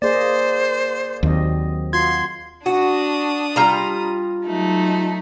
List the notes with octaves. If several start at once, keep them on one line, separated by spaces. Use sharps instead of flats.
A#3 G#4 C5 D5 D#5
D#2 F#3 C4 D#5
F4 F#4 C6 G#6
D4 F#4 D#6
G3 F4 A#5
F#3 A3 D#4